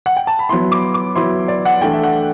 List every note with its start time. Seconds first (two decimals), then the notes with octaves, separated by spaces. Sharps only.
0.06 F#5
0.17 G5
0.27 A5
0.39 B5
0.49 F#3 B3 E4 C6
0.72 D6
0.94 D6
1.15 F#3 B3 E4 C6
1.48 D5
1.65 F#5
1.81 E3 A3 D4 G5
1.93 E5
2.03 F#5